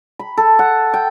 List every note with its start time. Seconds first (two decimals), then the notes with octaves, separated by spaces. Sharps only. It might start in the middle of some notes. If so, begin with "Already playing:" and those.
0.19 B5
0.37 A4
0.59 F#5
0.94 G5